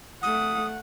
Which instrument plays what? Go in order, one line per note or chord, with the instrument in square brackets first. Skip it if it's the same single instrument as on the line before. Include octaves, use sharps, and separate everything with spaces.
[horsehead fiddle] A3 F#5 [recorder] D#6